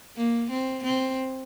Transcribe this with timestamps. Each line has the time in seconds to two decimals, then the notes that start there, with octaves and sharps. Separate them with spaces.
0.16 A#3
0.50 C4
0.84 C4